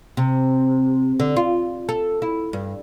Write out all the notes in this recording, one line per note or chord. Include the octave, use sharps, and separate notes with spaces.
C3
D3
F4
A4
E4
G2